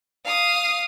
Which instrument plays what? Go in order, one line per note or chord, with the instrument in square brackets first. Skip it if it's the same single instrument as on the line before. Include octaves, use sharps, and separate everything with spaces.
[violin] F5 D#6